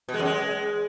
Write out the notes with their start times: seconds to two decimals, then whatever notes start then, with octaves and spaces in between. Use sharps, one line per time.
0.08 B2
0.14 G#3
0.19 F#2
0.25 G#3